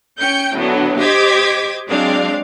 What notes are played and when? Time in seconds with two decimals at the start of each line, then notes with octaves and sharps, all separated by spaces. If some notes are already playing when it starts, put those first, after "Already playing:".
0.20 C#4 G5 G6 C#7
0.57 A2 D3 F#3 B3
0.99 G4 C5 D#5 D6 G#6 B6
1.88 F#3 G#3 C4 D4 D5 F5